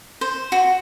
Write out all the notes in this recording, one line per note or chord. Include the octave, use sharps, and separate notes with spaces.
C5
F#4